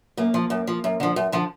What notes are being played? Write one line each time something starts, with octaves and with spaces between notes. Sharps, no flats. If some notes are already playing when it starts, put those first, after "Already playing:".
F#2 A#3
F3
F#2
F3
F#2
D3 F3
F#2
D3 F3